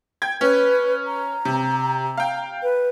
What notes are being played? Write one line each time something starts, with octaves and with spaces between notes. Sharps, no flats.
G5 G#6
C#4 B4
A#5
C3
F5 G5
B4